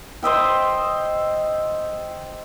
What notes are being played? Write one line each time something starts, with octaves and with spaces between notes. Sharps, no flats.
C5 D#5 E5 G5